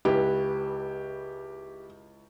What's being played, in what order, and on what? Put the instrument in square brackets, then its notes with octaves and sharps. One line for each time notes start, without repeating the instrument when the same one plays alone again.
[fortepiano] C#2 E4 B4 [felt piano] G4